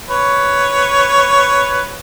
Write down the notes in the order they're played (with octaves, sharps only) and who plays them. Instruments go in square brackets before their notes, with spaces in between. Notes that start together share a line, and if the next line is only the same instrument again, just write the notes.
[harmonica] B4 C#5